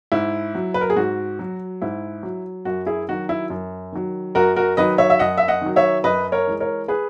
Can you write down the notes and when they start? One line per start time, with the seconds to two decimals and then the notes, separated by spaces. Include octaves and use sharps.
0.12 G#2 E4
0.55 F#3
0.74 B4
0.81 A#4
0.90 G#4
0.96 G#2 F#4
1.39 F#3
1.82 G#2 E4
2.23 F#3
2.65 F#2 F#4
2.86 E4 G#4
3.08 D#3 F#3 F#4
3.29 E4
3.50 F#2
3.92 D#3 F#3
4.35 F#2 F#4 A#4
4.56 F#4 A#4
4.77 D#3 F#3 B4 D#5
4.98 C#5 E5
5.10 E5
5.19 F#2 D#5 F#5
5.38 E5
5.48 D#5 F#5
5.62 D#3 F#3
5.76 C#5 E5
6.04 F#2 B4 D#5
6.32 A#4 C#5
6.47 E3 G#3
6.60 A#4 C#5
6.88 G#4 B4